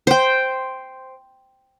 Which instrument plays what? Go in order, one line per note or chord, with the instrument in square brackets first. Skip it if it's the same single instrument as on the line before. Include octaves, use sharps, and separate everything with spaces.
[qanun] C5 G5